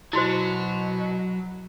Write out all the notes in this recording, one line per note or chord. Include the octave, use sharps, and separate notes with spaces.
B2 F#3 E4 F#4 C5